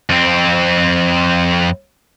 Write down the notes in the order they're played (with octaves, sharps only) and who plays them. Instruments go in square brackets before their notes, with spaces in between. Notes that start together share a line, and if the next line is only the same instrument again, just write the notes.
[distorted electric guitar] F2 C4